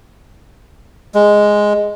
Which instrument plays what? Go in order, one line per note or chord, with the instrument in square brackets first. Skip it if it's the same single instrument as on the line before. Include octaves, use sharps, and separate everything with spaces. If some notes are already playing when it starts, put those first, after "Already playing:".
[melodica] G#3